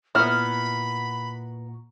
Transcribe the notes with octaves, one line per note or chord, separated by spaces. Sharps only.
A#2 B3 E4 F#5 A#5 B5 C#6 F6